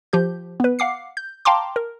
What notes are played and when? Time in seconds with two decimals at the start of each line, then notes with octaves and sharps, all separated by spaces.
0.13 F3 G4 G6
0.60 B3 B4
0.79 F5 F#5 D6 C7
1.17 G6
1.45 F5 G5 A5 A#5 C6 D6
1.76 A#4